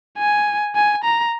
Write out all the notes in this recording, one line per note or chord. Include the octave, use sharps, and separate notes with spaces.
G#5
G#5
A#5